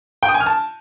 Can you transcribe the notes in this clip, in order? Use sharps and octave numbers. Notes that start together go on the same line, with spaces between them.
G5
D#6
G#5
F6
A5